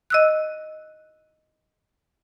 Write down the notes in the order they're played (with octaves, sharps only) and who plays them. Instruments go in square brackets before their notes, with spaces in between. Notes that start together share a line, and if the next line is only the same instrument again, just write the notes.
[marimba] D#5 E6 F#6